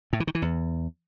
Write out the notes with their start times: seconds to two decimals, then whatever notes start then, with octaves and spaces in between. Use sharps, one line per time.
0.13 A2
0.20 E3
0.27 D#3
0.35 E3
0.42 E2